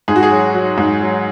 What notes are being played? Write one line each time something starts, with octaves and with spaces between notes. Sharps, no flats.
G#2 G#4
F#4
G#4
F#3
F#3
G#2
F#3